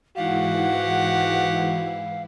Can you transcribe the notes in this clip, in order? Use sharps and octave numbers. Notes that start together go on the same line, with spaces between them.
G#2 E3 E4 F#4 G4 F5 F#5